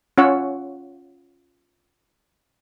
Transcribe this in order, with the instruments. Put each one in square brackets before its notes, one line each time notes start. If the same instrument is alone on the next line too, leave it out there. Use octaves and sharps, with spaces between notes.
[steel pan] C#4 F4 C#5 F#5 E6